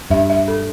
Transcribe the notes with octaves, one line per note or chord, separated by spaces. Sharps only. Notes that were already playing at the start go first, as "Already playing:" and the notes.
G2 E5
E5
A4